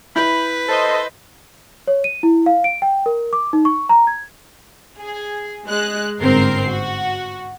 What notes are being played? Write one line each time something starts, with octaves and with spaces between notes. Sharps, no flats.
E4 B4 B5 G6
A4 C5 D#5
C#5
D#7
E4
F5
D7
G5
A#4
D6
D#4
C#6
A#5
G#6
G#4
G#3 F#6
G1 G#2 C4 A#4 C7
F#4